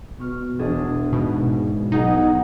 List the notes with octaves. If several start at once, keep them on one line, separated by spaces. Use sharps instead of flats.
B2 C#6 F6
E1 D4 G#4
G#2 B2
B1 B3 D#4 G#4 F#5